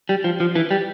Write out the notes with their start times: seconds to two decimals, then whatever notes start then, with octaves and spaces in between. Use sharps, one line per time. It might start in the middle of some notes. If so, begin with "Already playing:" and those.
0.09 G3
0.24 F3
0.40 F3
0.56 E3
0.71 G3